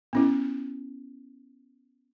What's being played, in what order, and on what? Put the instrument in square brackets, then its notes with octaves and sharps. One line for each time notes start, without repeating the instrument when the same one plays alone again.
[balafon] B3 C#4 E4